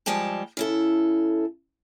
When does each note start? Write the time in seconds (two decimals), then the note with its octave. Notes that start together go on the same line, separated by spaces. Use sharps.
0.06 F3 G3 G#3 G5 A5
0.57 C#3 E4 A4